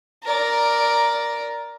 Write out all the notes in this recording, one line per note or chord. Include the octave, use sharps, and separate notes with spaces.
A#4 D5